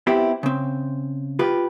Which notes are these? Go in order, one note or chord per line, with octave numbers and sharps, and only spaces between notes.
B3 C4 E4 G4
C#3 C4
F4 G4 B4